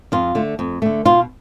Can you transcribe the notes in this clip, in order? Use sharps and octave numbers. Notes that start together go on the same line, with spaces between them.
F2 F4
D3 A3
F2
D3 A3
B2 F4